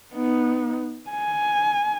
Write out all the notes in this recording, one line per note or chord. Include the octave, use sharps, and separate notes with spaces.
B3 D#4
G#5